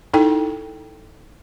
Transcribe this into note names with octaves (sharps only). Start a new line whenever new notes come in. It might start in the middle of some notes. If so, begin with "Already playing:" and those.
D#4 E4 A4 G5